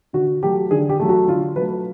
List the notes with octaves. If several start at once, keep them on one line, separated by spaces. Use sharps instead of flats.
D3 F#4
F#3 A3 G4
D3 G#4
G4
F#3 A3
F#4
D3 F4
F#3 A3 B4